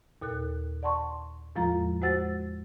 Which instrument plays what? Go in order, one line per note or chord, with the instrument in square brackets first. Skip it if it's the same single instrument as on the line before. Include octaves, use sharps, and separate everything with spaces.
[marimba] D#2 A#2 A4 F#6
D5 F#5 A5 C6 C#6
E2 A2 F3 G#3 F4 A#5
G#3 F#4 C5 F#5 E6 A6